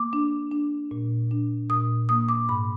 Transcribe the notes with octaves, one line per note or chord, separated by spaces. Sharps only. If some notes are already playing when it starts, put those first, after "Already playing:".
Already playing: A#3 D6
D4
D4
A#2
D4
A#2 D#6
A#3 D#6
D6
G#2 B5